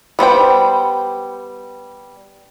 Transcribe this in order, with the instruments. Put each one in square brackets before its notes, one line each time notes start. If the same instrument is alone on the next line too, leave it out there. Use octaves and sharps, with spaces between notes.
[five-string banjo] G3 B3 C5 G5